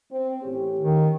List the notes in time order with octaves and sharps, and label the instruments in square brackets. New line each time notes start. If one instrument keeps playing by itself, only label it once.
[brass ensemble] C4
A1 C#4 G4
[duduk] D#3